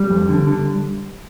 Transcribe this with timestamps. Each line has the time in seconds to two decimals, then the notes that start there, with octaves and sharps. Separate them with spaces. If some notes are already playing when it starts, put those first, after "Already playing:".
Already playing: G3
0.10 F2
0.29 D3
0.47 D3